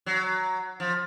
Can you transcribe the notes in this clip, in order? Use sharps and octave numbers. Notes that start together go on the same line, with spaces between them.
F#3
F3